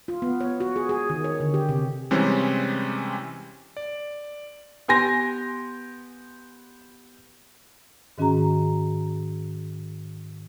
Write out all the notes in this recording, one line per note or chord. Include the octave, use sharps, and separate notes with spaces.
F4
B3
C#5
F#4
G#4
G#4
D#3
C#5
D3
G4
C3
C3 E3 G3 G#3 C4 C#4
D5
B3 G4 G#5 C6 A#6
G#2 D#3 C#4 F#4 G#4 A#5